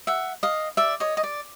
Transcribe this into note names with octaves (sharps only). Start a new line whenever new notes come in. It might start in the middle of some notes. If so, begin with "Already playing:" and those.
E5 F#5
D#5 F5
D5 E5
C#5 D#5
D#5
D5